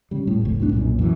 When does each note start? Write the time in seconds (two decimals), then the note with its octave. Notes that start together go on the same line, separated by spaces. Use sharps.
0.11 C#3 G3
0.27 A2
0.41 F1 C#2 A2
0.60 D1 C2 A2 D4
0.73 B1 F#2 A#2
0.99 F#2 E3